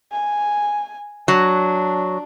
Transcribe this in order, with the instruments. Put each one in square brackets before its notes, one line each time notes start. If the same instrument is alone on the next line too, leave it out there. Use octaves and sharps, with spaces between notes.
[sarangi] G#5
[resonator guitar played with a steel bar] F#3 [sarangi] D4